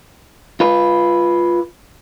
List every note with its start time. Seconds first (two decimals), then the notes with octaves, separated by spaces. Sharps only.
0.60 F4 B4